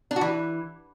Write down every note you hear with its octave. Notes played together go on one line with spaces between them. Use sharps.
D4
F#4
E3